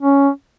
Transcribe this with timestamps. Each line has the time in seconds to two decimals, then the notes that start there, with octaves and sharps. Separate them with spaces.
0.01 C#4